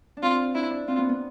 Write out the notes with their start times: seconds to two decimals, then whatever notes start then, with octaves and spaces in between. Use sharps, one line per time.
0.17 D4
0.23 C4 F4
0.55 D4 E4
0.70 D4
0.88 C4 F4
0.98 B3
1.09 B3